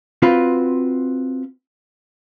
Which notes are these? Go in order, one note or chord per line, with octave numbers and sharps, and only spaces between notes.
C4 F4 F#4 B4